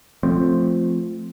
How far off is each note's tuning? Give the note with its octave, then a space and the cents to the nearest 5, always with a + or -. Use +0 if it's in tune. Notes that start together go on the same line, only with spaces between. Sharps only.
F3 +0 A3 +0 C4 +0